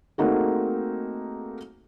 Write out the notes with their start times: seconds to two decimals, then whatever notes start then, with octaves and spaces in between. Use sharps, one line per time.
0.18 A3 A#3 C4 D#4 F#4 G#4